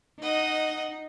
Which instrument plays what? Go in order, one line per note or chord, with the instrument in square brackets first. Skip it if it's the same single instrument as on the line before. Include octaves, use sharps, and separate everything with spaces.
[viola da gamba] D#4 [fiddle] D#5 F#5